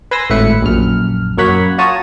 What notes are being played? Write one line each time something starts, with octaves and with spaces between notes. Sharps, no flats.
B4 G#5 B5 C6 E6 A#6
G#1 A2 E4 B4 E5 C#7
A#1 F#2 F6
F#2 A#3 C#5 F#5 B5
F4 F#4 C#5 A5 A#5 D#6